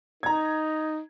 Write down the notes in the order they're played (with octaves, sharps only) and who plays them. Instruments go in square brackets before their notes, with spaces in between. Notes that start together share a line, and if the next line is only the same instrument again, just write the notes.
[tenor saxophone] D#4 [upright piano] A#5 G#6